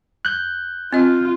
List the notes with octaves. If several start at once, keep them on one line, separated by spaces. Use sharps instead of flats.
F#6 G6
C4 F4 D#5